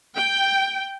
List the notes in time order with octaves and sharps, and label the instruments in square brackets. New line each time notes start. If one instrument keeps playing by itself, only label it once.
[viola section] G5